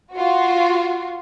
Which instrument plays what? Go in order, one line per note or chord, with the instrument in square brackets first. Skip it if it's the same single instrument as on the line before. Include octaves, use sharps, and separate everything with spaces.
[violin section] F4 F#4